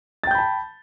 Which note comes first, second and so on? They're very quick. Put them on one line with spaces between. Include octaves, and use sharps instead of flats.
A6 G5 G6 B5 A5